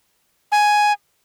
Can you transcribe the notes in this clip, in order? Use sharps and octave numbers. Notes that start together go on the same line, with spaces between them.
G#5